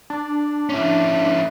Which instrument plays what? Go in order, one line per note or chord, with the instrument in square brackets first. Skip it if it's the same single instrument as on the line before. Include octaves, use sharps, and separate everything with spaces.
[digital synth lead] D4
[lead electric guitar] C#4 E4